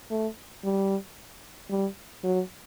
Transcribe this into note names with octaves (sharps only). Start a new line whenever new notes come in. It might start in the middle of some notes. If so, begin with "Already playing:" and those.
A3
G3
G3
F#3